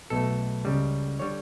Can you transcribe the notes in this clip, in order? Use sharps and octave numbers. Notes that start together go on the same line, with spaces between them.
B1 B2 A3 A4
C#2 C#3 G3
D3 G3 C#5